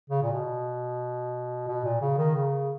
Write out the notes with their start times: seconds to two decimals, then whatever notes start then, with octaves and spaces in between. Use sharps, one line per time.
0.10 C#3
0.22 A#2
0.32 B2
1.68 B2
1.84 A#2
2.01 C#3
2.18 D#3
2.35 C#3